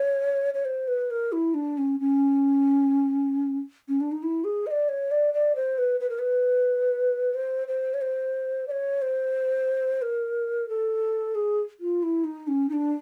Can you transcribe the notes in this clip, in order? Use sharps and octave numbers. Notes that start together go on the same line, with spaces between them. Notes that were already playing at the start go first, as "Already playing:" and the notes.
Already playing: C#5
C#5
C5
B4
A#4
E4
D4
C#4
C#4
C#4
D4
D#4
E4
G#4
D#5
D5
C#5
D5
D5
C5
B4
B4
A#4
B4
C5
C5
C#5
C5
D5
C#5
C5
A#4
A4
G#4
F4
E4
D#4
C#4
D#4
D4